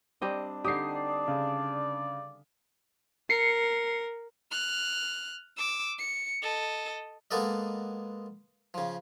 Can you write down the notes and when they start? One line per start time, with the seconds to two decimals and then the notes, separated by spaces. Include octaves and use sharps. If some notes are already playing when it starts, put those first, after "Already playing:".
0.22 G3 C4 D4 D#5
0.65 D3 D#4 G4 D#6 C7
0.94 D5
1.28 C#3
3.30 A#4 C7 C#7
4.51 F6 F#6
5.57 D6 E6
5.98 C#7
6.42 A4 D#5
7.31 G#3 A#3 B3 A4 D5 D#5
8.74 C#3 F3